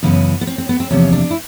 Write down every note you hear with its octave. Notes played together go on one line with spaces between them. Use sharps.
F#2 C#3 E3 G#3 B3
B3
C4
C4
B3
C4
E2 C3 F3 A#3 C#4
D4
E4